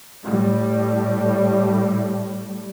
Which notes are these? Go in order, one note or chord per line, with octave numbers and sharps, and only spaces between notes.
A2 G3